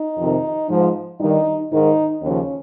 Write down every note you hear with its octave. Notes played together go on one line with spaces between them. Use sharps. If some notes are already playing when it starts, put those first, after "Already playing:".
Already playing: D#4
F2 C3 D#3
G#2 F3
G2 D#3 D#4
G#2 D#3 D#4
D#2 C#3 F3 C#4